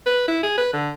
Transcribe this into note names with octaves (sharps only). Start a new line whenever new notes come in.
B4
E4
G#4
B4
D3